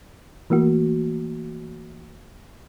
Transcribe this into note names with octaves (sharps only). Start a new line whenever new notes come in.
E3 A3 A#3 F#4